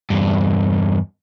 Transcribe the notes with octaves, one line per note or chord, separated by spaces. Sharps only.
E2 G2